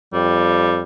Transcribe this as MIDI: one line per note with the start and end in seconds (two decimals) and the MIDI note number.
0.14 0.83 41
0.14 0.83 55